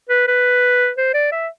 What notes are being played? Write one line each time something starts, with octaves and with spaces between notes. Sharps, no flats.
B4
B4
C5
D5
E5